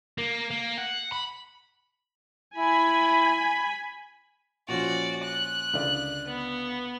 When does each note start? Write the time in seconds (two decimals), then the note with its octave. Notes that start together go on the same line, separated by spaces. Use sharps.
0.18 A#3
0.51 A#3
0.78 F#5
1.12 B5
2.56 E4 G#5 B5
4.68 A#2 F3 C#4 F#4 D5
5.24 F#6
5.73 C#2 D3 D5
6.27 B3